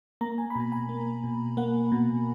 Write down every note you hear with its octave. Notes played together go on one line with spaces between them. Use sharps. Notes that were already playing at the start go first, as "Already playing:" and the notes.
A#3 A#5
G#5
B5
B2 A#5
G#5
A#3
B2
A#3 F#5
B2